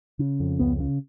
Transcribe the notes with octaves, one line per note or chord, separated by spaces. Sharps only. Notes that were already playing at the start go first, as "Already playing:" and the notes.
C#3
F2
C#2 B3
C#3